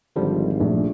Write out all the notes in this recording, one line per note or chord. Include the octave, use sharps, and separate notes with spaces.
G#1 D3 F3 G3
A#1 A3